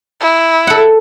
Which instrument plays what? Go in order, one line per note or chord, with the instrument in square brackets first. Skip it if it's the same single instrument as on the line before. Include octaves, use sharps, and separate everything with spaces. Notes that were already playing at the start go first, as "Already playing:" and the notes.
[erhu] E4
[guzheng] A4 F#5